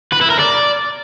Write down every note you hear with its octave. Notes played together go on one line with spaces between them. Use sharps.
B4
E4
A#4
D5